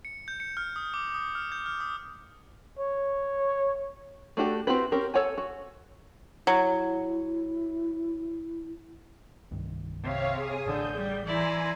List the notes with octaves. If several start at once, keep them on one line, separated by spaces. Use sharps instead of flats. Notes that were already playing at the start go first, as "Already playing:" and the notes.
C#7
G6
C#7
F6
D#6
D6
D#6
F6
G6
F6
D#6
C#5
A3 D4 F#4 G4 A4
C4 E4 F#4 G4 B4
C4 C#4 G4 A#4
A4 C#5 F#5 G#5
F#4
F#3 E4
C2 G2 D#3
C3 C#5 F5
G#4 D#6
A1 D3 G6
G3
E3 E4 D5 G#5 A#5 C6